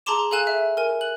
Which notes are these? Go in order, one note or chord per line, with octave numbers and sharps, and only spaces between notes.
G#4 A5 A#5 C6 D6 E7
G#4 A4 F5 G#5 F#6 E7
E5
A#4 G#5
F#6 F#7